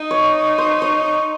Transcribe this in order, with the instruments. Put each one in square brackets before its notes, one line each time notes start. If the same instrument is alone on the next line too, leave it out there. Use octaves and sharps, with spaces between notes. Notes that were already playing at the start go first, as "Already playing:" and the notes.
Already playing: [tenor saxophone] D#4 [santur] D#5
[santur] C#5
C5
C#5